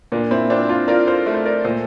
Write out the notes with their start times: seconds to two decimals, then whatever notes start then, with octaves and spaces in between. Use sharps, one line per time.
0.12 A#2 A#3 D4
0.31 C4 E4
0.50 C4 D4 F4
0.69 D4 F4
0.88 F4 A#4 D5
1.07 A4 C5
1.26 A3
1.34 C5
1.46 A#4 D5
1.64 A#2 A4 C5